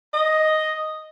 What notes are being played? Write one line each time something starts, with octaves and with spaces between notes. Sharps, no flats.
D#5